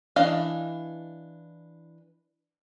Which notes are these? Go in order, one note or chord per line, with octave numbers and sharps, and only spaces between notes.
E3 D4 D#5 F5